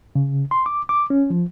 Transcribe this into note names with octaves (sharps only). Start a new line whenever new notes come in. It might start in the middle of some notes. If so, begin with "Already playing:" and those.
C#3
C6
D6
D6
C#4
F3